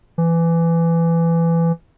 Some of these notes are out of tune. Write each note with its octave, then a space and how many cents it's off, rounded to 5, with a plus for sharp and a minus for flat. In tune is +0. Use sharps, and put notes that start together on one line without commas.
E3 +20